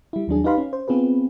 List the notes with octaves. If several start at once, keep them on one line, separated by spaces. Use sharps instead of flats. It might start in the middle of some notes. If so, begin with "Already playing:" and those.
G3 E4
D#2 F#3 D4 G#4
D#4 G4 B4 F5 B5 C6
C#4
C5
B3 C4 F4 G#4 B4